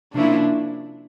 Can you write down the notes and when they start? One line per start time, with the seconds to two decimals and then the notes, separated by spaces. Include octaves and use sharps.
0.13 C3 F3 A#3 C#4 D4 E4